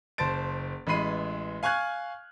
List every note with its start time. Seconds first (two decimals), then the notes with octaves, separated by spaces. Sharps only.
0.18 F#1 C5 A5 A6 D7
0.87 A1 E3 G#3 B5 C7 D#7
1.63 F5 G#5 C#6 F6 F#6 G#6